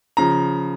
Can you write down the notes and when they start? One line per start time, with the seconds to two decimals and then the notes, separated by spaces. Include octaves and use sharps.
0.17 C#3 F3 A#5